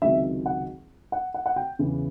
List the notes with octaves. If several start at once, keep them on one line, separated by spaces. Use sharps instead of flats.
C#2 C3 D#3 F#3 E5
F#5
F#5
F#5
F#5
G5
E2 C#3 E3